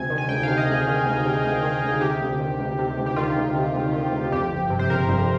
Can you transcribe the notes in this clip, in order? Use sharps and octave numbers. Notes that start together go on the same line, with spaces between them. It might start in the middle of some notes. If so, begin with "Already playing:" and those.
Already playing: D2 C3 G#5
D#3
G#5
D2 G5
F5
C3
D#5
D2 G#4
D#3
D2
C3
D2
D#3
D2
C3 G4
D2
D#3
D2
C3
D2
G4
D#3 F4
D2
C3
D2
D#3
D2
F2 G4
G1
C3
C5
G1 A#4
F2